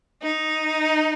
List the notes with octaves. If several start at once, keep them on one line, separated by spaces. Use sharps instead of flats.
D#4